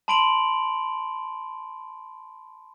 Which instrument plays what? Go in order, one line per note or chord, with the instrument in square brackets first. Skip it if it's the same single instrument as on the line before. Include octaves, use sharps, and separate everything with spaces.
[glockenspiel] A5 B5 C6 D7 F7 F#7